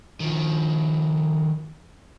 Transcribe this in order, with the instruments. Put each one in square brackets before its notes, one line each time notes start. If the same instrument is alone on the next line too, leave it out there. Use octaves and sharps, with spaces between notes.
[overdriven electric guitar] D#3 F3